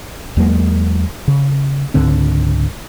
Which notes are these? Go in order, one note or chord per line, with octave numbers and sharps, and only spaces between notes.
E2 F#3 G#3 A#3
C#3
C#2 G#2 D3 C4